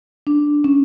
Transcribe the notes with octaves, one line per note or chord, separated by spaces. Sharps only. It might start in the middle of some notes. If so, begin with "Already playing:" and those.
D4
C#4